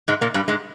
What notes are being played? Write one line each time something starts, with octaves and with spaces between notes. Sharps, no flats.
G#2 G#3
A#2 A#3
G2 G3
G#2 G#3